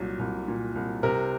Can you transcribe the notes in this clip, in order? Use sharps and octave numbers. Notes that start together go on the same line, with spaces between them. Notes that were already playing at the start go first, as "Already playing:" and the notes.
Already playing: C2 A#2 F#3
C2
A#2
C2
C3 A#4